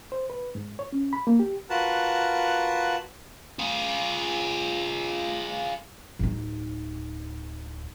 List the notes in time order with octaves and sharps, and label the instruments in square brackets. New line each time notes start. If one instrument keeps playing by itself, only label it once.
[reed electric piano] C5
B4
G#2
C#5
C#4
B5
A#3
G4
[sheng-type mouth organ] F4 F#4 A#4 B4 F#5 A5
[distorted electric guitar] F4 G#4
[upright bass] D1 D#4